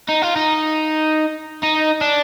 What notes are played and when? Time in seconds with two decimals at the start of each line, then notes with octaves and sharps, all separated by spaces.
0.09 D#4
0.22 F4
0.36 D#4
1.63 D#4
2.01 D4